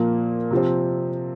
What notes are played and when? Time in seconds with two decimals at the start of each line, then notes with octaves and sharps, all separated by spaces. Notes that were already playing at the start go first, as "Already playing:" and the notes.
Already playing: A#2 F3 A#3
0.51 C3 F3 C4